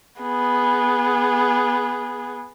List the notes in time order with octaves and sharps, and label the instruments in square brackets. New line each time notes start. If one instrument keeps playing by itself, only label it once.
[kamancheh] B3 G#4